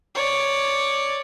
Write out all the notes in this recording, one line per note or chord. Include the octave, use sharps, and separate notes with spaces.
C#5 D5